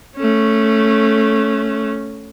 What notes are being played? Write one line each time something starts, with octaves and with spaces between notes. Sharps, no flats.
A3 C#4